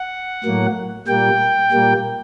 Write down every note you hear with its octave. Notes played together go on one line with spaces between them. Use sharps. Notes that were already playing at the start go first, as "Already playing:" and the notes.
Already playing: F#5
A2 F#3 A#3
A#2 G3 A#3 G5
A#2 G3 A#3